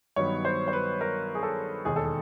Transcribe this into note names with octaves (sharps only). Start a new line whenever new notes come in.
G2 D#3 F#3 B3 C#5
C5
C5
B4
A#4
G#4
A4
E1 D#2 D#3 G#4
A4
G#4